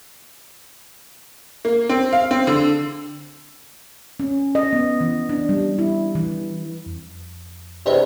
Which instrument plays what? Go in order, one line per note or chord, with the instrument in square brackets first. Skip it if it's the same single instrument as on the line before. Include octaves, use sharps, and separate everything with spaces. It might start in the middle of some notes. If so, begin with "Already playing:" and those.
[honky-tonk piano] A#3
C4
F5
C4
D3
[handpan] C#4
D#5
B3
E3
D4
G3
E4
E3
[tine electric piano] F2
[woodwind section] E2 G2 C3 [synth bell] C5 D5 D#5